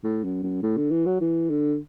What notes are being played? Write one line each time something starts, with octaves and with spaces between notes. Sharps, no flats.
A2
F#2
F#2
A2
D3
E3
F#3
E3
D3